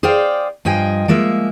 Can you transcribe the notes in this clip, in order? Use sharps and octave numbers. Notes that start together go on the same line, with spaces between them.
G#4 C5 D5 F5 G5
G2 F3 D#5 G5 G#5
F3 G#3 A#3 E5